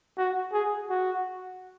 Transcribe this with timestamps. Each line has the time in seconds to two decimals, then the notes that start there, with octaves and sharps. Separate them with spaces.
0.18 F#4
0.53 G#4
0.90 F#4